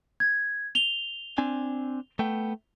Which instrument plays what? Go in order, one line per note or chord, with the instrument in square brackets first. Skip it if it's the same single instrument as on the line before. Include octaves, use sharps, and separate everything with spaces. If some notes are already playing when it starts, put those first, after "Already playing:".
[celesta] G#6
F7 G7
[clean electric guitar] C4 D4 G#5
A3 B3 G5